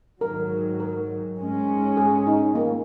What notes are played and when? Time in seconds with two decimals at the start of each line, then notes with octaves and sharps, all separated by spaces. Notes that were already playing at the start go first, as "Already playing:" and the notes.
0.21 G#2 D#3 F#3 A#4
0.80 A#4
1.38 G#2 G#3 C#4
1.97 G#4
2.27 D#4
2.55 A#3